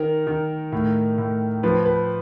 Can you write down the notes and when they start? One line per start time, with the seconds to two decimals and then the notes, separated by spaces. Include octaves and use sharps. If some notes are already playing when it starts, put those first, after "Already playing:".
Already playing: D#3 A#4
0.27 D#3
0.72 A2
1.18 A2
1.63 F3 B4
1.85 B4